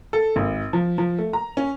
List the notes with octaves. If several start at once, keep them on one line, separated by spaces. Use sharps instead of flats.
A4
G#1
F3
F3
A3
A#5
C#4